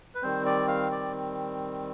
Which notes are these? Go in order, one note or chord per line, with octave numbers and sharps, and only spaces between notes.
B4
D#3 G3 C4 C5
D5
F5
D5